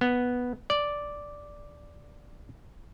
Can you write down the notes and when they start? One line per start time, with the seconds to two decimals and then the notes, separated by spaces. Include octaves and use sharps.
0.01 B3
0.70 D5